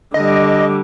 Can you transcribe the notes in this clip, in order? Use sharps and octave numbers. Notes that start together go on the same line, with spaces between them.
D3 G3 D#5